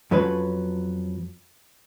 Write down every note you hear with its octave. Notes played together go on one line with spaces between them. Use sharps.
F2 F#3 C#4 A4 B4